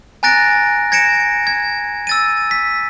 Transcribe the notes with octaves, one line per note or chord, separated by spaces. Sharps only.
G#5 A#5 F#6 A6 A#6 D7
G#6 A#6 C#7 D7 E7
G#6
E6 A6 D#7
B6